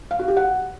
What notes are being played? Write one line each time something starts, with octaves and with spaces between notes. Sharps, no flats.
F5
F#4
G4
F#5